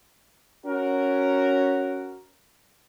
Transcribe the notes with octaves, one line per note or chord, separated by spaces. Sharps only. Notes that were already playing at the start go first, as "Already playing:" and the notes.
C#4 F#4 A#4